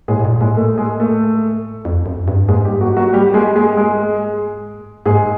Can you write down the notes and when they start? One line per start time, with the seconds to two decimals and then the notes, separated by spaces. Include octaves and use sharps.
0.08 A2 G#3 G#4
0.20 A2
0.25 A#2
0.41 A2 G#3 G#4
0.56 A3 A4
0.78 G#3 G#4
1.00 A3 A4
1.85 F2
2.06 F#2
2.28 G2
2.48 G#2 G#3 G#4
2.65 G3 G4
2.81 F#3 F#4
2.97 F#3 F#4
3.13 G3 G4
3.34 G#3 G#4
3.56 G#3 G#4
3.77 G#3 G#4
5.06 G#2 G#3 G#4